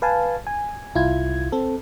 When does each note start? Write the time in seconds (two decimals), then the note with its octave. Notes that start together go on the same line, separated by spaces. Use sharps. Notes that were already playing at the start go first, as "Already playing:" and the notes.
0.02 B4 F5 G#5 A5
0.47 G#5
0.95 C2 E4 F4 G#6
1.52 C4 A4